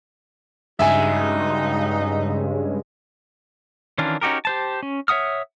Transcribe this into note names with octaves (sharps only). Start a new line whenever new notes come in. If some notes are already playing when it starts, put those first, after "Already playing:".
G2 C#3 G#3 D#4 F#4 E5 G#5
D#3 E3 C#4 D4 F4
C#4 D#4 F#4 G4 A#4
G4 C5 A5
C#4
C#5 E5 F#5 D#6 F6